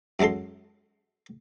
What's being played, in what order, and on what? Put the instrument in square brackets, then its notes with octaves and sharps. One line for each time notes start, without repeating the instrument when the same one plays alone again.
[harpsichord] F#2 F#3 G#3 A4 C6